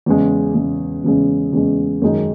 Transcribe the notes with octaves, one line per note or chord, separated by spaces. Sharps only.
E2 C#3 G#3
E2 C#3 G#3
E2 C#3 G#3
E2 C#3 G#3
F#2 D#3 G#3 D#4